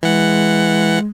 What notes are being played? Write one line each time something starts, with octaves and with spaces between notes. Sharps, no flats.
E3 G#3 F#5